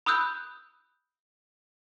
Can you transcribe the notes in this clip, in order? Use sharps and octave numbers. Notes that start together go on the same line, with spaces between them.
B5 D#6 E6 F#6 G6